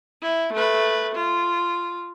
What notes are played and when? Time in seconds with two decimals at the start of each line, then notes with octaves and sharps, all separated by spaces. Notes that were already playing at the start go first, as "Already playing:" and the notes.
0.22 E4
0.53 A3 B4
1.15 F4